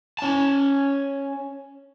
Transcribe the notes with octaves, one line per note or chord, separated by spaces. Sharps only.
C#4 A5